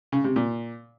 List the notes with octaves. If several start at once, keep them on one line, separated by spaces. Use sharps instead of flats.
C#3
C3
A#2